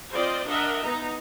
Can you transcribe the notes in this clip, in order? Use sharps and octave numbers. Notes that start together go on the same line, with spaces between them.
C4 F4 C5 D5 D#5
D4 A#4 D#5 E5 F#5
B3 D#4 A#5